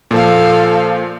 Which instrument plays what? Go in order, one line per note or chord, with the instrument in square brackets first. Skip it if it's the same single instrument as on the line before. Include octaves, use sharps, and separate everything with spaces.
[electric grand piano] A#2 F3 [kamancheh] A4 F5